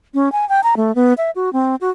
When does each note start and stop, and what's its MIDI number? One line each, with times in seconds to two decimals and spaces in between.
0.14 0.32 61
0.32 0.48 80
0.49 0.61 79
0.64 0.74 82
0.77 0.94 57
0.95 1.14 59
1.18 1.31 76
1.36 1.52 66
1.53 1.76 60
1.81 1.90 66